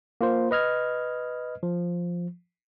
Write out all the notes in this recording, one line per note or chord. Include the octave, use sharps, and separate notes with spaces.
A#3 F4 C5
B4 D#5 F6 G#6
F3